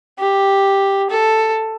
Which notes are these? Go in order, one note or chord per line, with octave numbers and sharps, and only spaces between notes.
G4
A4